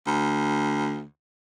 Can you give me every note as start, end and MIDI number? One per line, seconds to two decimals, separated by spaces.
0.07 1.04 38